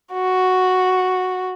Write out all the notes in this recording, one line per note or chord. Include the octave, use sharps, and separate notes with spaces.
F#4